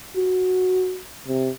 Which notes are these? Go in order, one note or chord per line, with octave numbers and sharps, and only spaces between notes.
F#4
C3